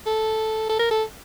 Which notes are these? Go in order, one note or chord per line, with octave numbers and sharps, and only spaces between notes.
A4
A4
A#4
A4